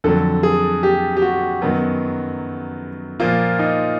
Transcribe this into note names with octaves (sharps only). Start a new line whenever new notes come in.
F2 D3 F#3 A4
G#4
G4
G4
F#4
F#2 D#3 F#3 B3
A#2 F3 A#3 F4
D#4